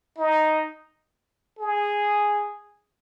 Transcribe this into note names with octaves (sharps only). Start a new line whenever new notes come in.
D#4
G#4